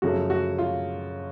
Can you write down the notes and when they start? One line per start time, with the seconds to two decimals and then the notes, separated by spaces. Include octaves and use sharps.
0.02 F#2 C#3 F3 A3 F#4
0.30 F#4
0.58 F4